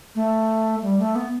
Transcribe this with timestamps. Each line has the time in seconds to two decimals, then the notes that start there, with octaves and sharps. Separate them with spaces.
0.15 A3
0.82 G3
0.99 A3
1.15 B3